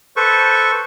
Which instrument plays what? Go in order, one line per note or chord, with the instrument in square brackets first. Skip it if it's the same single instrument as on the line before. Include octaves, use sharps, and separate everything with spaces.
[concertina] A4 B4 C5 C#6